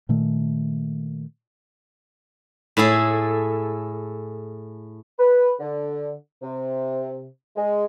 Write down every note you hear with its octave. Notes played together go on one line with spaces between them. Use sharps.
A#2 D#3 A3
A2 E4 G#4 A4
B4
D3
C3
G#3